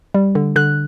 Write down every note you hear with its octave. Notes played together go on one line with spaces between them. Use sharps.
G3
D3
D3 F#6